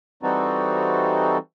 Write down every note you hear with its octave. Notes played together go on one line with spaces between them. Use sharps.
E3 G3 C4 D#4 F#4 A4